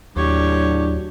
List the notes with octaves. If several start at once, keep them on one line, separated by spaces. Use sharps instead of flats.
D#2 A2 F#3 D4 G4 C#5